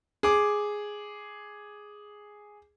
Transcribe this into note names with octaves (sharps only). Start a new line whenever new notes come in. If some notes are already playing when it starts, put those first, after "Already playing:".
G#4 D6